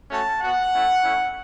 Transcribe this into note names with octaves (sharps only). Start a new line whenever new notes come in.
A3 C#4 F#4 A5
B3 F#4 F#5
A3 C#4 E4
A3 C#4 E4